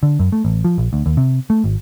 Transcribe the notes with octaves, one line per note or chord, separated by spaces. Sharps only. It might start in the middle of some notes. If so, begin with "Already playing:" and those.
D3
F#2
A3
A1
F3
A#1
D2
D#2
C3
A3
G#1